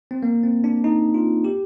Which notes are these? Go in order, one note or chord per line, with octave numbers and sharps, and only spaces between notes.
C4
A#3
C4
D4
D#4
F4
G4